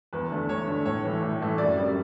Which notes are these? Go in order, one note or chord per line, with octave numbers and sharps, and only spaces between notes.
E2 B4
D3 A3
E2 C#5
D3 A3
A2 C#5
E3 A3
A2
E3 A3
F#2 D5
C#3 G3